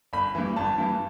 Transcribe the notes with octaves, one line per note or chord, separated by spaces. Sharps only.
G1 B5
G2 E3
G1 A5
G2 E3